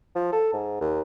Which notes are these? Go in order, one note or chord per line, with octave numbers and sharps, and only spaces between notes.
F3
A4
G#2
D#2